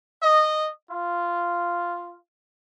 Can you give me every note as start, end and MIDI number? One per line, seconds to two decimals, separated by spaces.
0.22 0.69 75
0.90 2.18 65